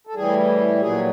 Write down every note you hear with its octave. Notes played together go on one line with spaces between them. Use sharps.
A4
A2 E3 G3 G#4
A#2 F#3 G#4